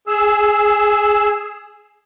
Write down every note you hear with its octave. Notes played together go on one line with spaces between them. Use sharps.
G#4 E6